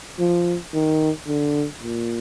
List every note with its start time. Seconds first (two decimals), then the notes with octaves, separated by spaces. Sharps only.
0.19 F3
0.73 D#3
1.27 D3
1.83 A#2